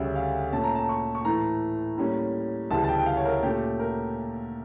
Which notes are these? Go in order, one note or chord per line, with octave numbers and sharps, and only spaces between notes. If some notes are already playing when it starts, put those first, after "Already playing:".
Already playing: D2 C#3 G3 C#4 E5
F5
A#2 A3 C#4 A5
A#5
A5
C#6
C#6
A2 E3 A3 A#5
A2 G3 A#3 C#4
D2 C#3 E3 G3 A5
A5
G5
G5
F5
C#5
A#4
A#2 A3 C#4 G4
A#4